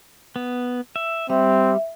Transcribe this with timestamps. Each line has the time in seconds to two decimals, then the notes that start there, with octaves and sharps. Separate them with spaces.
0.36 B3
0.96 E5
1.30 G3 C4 E5